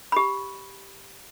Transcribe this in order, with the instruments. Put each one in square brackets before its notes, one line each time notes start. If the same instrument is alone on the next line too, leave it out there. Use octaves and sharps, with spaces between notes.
[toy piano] G4 B5